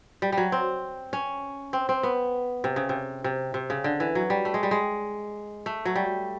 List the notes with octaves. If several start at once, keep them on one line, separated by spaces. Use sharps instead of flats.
G3
G3
F#3
C4
C#4
C4
C4
B3
C3
C#3
C3
C3
C3
C#3
D3
E3
F#3
G3
A3
G#3
G3
G#3
A3
F#3
G3